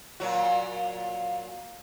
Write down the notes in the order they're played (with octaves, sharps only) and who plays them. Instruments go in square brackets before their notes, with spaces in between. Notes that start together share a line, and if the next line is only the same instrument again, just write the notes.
[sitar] A#2 F#3 F#4